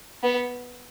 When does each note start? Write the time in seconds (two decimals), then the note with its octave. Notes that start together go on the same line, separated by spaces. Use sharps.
0.23 B3